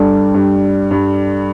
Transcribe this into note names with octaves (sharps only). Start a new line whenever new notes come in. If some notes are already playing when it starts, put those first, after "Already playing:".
Already playing: G2 G3 D4 A4 D5
G2
G2